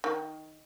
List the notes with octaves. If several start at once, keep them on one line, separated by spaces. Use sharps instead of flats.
D#3